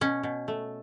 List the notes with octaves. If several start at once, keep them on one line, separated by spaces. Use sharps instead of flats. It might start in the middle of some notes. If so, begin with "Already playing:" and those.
B2 C#4
B2
A3